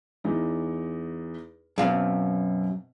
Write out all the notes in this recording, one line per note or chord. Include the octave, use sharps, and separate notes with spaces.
E2 D#4
F#2 B2 C4 F5